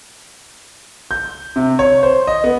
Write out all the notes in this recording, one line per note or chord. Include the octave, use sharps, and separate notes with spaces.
G6
C3
C#5
C5
D#5
B3